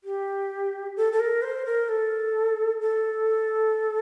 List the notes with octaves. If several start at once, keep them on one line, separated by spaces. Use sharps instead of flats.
G4
A4
A4
A#4
C5
A#4
A4
A4